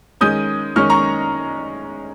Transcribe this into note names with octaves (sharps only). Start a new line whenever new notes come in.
D#3 G#3 C#4 D#6 G6
D#3 G#3 C#4 C#6 F6
A#5 C#6